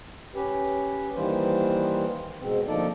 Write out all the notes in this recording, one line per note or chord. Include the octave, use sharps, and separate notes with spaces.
C#4 G4 B4
D#3 E3 G3 A#3 B4 C5
G#2 B2 C4
D2 F3 A#3 D#4 A4 D5